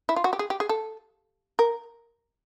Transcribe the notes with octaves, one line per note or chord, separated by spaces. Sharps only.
E4
F4
F#4
G4
G#4
G4
G#4
A4
A#4